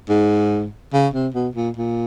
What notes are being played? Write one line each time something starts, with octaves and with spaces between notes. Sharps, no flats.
G#2
C#3
C3
B2
A#2
A#2